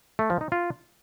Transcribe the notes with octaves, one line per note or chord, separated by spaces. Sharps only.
A3
F3
D#4
F4